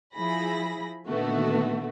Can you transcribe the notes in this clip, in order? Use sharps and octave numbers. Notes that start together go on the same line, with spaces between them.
F3 E4 G#4 B5 A#6
A#2 D3 D#3 A3 B3 F#4